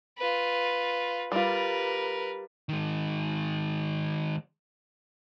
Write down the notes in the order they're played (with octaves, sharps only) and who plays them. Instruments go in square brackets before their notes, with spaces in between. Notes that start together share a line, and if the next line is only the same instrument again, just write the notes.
[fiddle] F4 B4
[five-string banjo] G3 F4 [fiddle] A#4 B4
[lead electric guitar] D#3 G#3